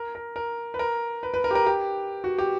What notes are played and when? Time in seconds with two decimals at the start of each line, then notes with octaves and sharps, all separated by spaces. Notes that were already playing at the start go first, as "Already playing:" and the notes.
Already playing: A#4
0.15 A#4
0.36 A#4
0.74 B4
0.79 A#4
1.23 B4
1.34 B4
1.44 A#4
1.51 G4
1.55 A#4
1.66 G4
2.24 F#4
2.38 G4